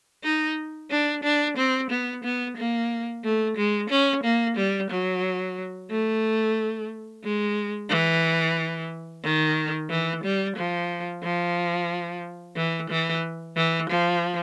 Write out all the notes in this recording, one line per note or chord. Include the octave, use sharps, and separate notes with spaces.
D#4
D4
D4
C4
B3
B3
A#3
A3
G#3
C#4
A#3
G3
F#3
A3
G#3
E3
D#3
E3
G3
F3
F3
E3
E3
E3
F3